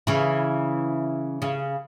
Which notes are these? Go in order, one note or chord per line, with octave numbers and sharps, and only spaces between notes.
C#3 E3
C#3